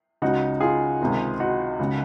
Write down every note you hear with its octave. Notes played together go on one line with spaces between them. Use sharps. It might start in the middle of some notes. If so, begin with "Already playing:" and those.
C#2 C#3 D#4 F#4
F4 G#4
C#2 C3 D#3
D#4 F#4
C#2 C#3